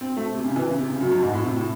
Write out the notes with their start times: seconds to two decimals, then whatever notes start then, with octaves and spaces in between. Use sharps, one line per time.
0.01 C4
0.17 A3
0.34 C3
0.44 C#3
0.56 E3
0.67 C#3
0.79 C3
0.90 C#3
1.01 F#2
1.11 F#2
1.23 G#2
1.33 A2
1.44 C3
1.56 A2